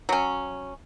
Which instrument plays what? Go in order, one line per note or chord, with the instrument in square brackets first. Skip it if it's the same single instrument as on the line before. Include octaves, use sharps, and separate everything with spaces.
[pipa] F#3 C#4